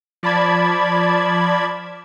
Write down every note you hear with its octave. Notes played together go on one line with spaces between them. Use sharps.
F3 D5 A5 B5 G#6